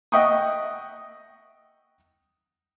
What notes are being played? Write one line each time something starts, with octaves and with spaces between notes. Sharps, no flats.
D#5 E5 F#5 G5 C#6 D#6